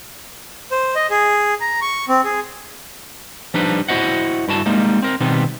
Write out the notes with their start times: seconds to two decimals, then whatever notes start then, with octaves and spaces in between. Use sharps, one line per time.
0.71 C5
0.96 D#5
1.10 G#4
1.61 A#5
1.82 C#6
2.09 C4
2.24 G#4
3.54 F3 G3 D4 D#4 B4
3.88 E4 F#4 C5 D#5 F#5
4.48 G2 E4 F#4 A5
4.66 G3 G#3 A#3 D#4
5.02 C4 A#4
5.20 B2 D#3 G3 B3 C4